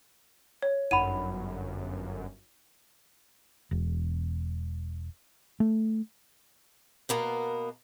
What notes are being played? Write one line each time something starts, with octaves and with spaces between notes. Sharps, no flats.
C#5
G1 F#2 D#4 F#5 B5 D#7
E1
A3
B2 A#3 B3 A#4